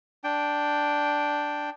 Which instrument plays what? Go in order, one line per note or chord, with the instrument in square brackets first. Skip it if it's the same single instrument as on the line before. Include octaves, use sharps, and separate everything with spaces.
[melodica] D4 G5